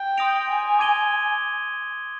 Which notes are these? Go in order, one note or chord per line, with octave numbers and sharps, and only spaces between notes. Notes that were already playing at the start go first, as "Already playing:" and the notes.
Already playing: G5
C6 D#6 A#6 D7 F7
G#5
D6 G#6 D#7 G7